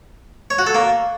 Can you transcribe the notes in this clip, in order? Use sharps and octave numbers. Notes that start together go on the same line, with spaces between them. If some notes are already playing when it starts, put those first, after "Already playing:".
C#5
F#4
A4
A#3